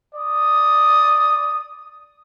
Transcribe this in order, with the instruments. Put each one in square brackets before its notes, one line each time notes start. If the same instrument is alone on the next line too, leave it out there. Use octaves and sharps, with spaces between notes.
[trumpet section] D5 D#6